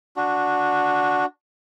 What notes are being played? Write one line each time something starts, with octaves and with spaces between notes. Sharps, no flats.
D4 F#4